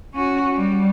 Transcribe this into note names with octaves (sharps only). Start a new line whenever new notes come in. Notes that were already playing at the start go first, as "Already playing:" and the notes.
C#4 F#4
G3